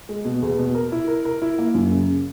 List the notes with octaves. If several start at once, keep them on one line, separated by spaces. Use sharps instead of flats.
G#3
B2
E2
B2
A#4
E4
A#4
A#4
E4
A#3
F#2
C#3
C#3